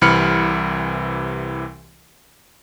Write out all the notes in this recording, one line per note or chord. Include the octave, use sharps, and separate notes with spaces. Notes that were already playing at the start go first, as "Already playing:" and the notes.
C2 C3 E3 B5 F6 C#7